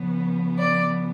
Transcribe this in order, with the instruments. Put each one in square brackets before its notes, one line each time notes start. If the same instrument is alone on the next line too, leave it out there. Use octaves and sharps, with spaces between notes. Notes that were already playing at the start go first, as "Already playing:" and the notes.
Already playing: [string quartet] C#3 F3 B3
D5